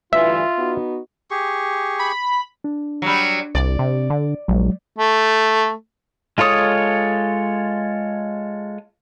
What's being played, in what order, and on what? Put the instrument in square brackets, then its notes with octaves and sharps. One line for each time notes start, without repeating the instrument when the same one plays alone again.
[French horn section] D2 G2 E3 [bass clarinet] F4 [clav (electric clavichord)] E5
[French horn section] B3 D#4 F#4
[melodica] G4 G#4 C#6
[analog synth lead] B5
[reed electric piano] D4
[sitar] F#3 G3
[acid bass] C2 [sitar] D5
[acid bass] C3
D3
[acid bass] A#1 [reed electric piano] F#3 G#3
[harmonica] A3
[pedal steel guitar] G#3 F4 A4 C#5 D#6